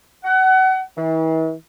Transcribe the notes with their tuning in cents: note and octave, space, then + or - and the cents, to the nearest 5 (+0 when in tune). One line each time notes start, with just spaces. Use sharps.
F#5 +30
E3 -40